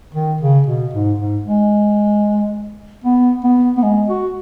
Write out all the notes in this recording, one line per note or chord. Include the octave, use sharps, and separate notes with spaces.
D#3
C#3
B2
G#2
G#2
G#3
B3
B3
B3
G#3
F#4